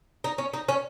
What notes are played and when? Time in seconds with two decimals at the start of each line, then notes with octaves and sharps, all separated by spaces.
0.24 D#4
0.38 C#4
0.53 D#4
0.69 C#4